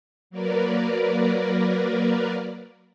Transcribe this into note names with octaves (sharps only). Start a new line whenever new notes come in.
F#3 A#3 A#4 B4 D5